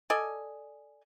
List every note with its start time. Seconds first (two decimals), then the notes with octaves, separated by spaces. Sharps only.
0.10 A4 D5 D#5 G#5